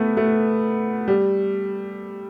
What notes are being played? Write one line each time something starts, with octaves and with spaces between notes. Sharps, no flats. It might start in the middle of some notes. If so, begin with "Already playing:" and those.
Already playing: A3 B3
A3
G3